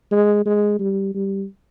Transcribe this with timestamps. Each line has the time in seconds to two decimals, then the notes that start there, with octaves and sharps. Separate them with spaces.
0.11 G#3
0.46 G#3
0.80 G3
1.14 G3